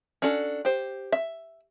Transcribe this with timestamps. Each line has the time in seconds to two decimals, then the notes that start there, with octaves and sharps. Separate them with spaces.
0.22 C#4 D4 F#4 A4
0.65 G4 C5
1.12 E5